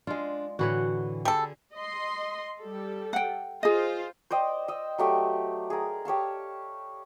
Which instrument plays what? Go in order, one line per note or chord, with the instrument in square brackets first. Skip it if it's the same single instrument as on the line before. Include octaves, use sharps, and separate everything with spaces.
[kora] G#3 F4 [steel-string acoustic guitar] D4
[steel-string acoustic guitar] A2 D3 E3 [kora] F#4 B4 C#5
[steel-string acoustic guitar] D3 G#4 [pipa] G3 A4
[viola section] D#5 C6
G3 A4
[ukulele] F#5 G5
[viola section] F4 C5 [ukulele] G#4 D#5
[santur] C5 D5 D#5 G5
D#5 E6
F#3 A3 G4
G#4 A#4
G4 C#5 F5 A5